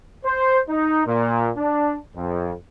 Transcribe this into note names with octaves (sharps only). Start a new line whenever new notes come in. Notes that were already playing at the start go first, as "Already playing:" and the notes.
C5
D#4
A#2
D4
F2